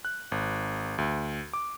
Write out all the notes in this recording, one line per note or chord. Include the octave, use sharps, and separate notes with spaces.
F#6
G#1
D2
D6